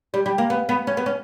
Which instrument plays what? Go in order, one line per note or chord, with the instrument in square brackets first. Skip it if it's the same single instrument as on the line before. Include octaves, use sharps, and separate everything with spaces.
[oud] G3
G3
A#3
B3
B3
C#4
B3
C#4